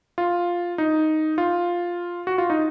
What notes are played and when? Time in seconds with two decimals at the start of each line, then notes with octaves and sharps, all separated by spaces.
0.18 F4
0.78 D#4
1.38 F4
2.27 F#4
2.38 F4
2.50 D#4